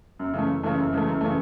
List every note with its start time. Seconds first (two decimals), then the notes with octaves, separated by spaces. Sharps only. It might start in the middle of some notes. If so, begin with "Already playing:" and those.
0.19 F#2
0.34 C#3 E3 A3
0.49 F#2
0.63 C#3 E3 A3
0.78 F#2
0.92 C#3 E3 A3
1.07 F#2
1.21 C#3 E3 A3